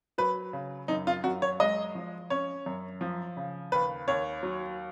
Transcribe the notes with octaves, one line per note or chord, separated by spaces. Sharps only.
F#3 B4
C#3
F#2 D#4
F4
F#2 F#4
C#5
G#3 D#5
F3
C#4 C#5
F#2
F3
C#3
D#2 B4
D#2 C#5
F#3